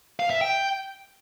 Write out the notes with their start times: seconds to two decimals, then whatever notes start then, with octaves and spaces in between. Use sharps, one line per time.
0.20 F5
0.30 E5
0.41 G5